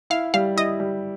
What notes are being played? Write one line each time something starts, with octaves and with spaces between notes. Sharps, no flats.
E4 F5
G3 F5
E4 D#5
G3